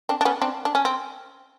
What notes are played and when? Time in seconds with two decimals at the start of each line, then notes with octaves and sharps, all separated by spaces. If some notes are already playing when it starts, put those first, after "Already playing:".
0.09 C4 D4
0.21 D4
0.25 B3 C#4
0.42 C4 D4
0.65 D4
0.75 C#4
0.85 C4